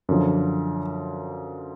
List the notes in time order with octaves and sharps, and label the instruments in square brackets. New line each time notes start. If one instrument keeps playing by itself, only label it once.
[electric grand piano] F#2 D3 F3